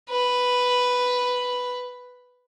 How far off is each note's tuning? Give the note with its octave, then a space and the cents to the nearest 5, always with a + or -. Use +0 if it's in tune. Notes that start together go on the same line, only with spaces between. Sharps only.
B4 +0